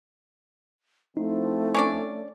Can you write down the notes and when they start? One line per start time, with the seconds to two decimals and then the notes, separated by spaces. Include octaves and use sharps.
1.17 F3 A3 C4 D#4 E4
1.74 C#4 D4 D5